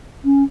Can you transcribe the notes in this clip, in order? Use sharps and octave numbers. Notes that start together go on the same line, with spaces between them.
C#4